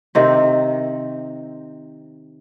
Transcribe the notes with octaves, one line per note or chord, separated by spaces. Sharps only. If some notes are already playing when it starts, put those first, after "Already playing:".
C3 D#3 C4